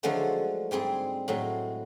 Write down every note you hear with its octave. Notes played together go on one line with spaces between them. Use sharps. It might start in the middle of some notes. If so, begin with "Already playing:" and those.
D3 F3 F#3 G#3 A3
G#2 G3 C4 G#4
A2 F#3 G#3